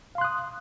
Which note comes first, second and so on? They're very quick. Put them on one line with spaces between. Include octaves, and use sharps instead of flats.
F5 C6 F#6 D#6